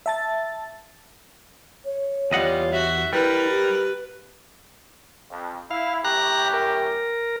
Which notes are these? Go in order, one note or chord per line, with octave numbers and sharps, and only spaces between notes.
E5 A5 A6
C#5
E2 G3 F4 D#5 F#5
F#4 E5
G3 E4 A#4 B4
G4
F2
E4 F5
F#2 A2 G4 A#5 F#6
A#4